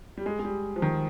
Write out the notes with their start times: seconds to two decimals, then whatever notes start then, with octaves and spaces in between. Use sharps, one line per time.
0.17 G3
0.26 G#3
0.39 G#3
0.45 G3
0.76 F3
0.82 D#3